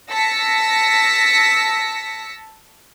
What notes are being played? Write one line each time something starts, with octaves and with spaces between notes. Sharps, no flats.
A5 E6 A#6 B6 C#7